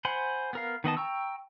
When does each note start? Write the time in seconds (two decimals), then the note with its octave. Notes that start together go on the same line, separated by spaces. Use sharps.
0.05 C5 F#5 G#5 B5 C6
0.53 B3 A#4 F5
0.84 D#3 B3 D#5 A5
0.97 G5 A#5 C#6 E6